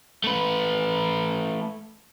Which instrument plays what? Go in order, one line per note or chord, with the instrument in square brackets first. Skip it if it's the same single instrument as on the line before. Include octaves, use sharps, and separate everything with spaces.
[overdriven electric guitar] A3 B4